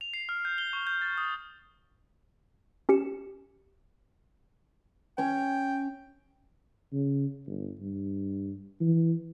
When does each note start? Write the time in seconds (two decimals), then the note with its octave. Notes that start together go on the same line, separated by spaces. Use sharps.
0.01 F7
0.14 C7
0.29 F6
0.45 G6
0.58 G7
0.73 C#6
0.87 G6
1.02 A6
1.18 D#6
2.89 C#4 G4 C#7 E7
5.18 C#4 C#5 G5
6.93 C#3
7.46 G1
7.80 G2
8.81 E3